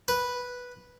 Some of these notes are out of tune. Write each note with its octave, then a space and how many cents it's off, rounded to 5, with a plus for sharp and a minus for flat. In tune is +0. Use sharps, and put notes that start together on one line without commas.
B4 -5